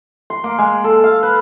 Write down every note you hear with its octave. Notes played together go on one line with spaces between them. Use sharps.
C6
A#3
G#3
A4
F5
B4